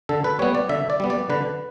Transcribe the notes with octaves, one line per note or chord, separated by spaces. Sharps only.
D3 A4
B4
G3 B3 C#5
D5
D3 E5
D5
G3 B3
D5
D3 B4